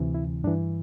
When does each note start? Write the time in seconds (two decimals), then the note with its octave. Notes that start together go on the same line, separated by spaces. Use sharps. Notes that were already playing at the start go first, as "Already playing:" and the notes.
Already playing: D2 C3 E3
0.14 E4
0.44 G2 E3 D4